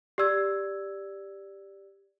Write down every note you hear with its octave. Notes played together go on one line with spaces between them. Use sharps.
G4 D5 E6 G#6